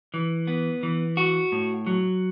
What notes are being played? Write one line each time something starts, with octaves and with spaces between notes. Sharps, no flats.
E3
B3
E3
F#4
A2
F#3